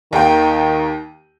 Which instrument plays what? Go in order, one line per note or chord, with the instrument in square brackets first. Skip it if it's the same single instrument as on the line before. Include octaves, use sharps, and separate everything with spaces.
[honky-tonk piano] D#2 A#3 G5 [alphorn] D#3